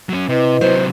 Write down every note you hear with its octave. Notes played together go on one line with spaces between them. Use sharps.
F#3 C#4
C3 E4 B4 D#5
C3 F#3 C5